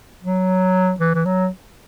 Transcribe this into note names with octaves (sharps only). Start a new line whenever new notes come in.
F#3
E3
E3
F#3